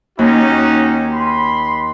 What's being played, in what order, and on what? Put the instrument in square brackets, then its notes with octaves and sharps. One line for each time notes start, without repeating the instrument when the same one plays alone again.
[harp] D#2 [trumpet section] C#4 D#4 F#4
[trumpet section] B5 C6